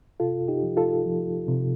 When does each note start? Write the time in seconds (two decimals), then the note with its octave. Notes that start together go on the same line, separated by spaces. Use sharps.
0.20 C3 F4 A4
0.48 D#4 G4
0.63 F3
0.77 F4 A4
1.06 F3
1.48 C3